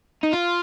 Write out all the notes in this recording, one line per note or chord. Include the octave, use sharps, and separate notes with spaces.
D#4
F4